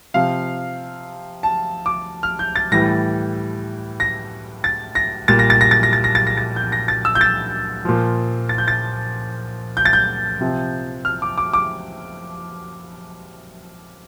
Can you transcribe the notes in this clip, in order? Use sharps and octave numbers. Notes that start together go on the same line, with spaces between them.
C3 F3 F5
A5
D6
F6
G6
A6
A2 E3 G3 A#6
A#6
A6
A#6
A#2 G3 A6
A#6
A6
A#6
A6
A#6
A6
A#6
A6
A#6
A6
G6
A#6
A6
E6
G6
A6
A#2 F3
A6
G6
A6
G6
A6
G6
C3 F3
F6
D6
D6
D6